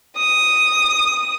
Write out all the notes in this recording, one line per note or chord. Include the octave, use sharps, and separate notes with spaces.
D#6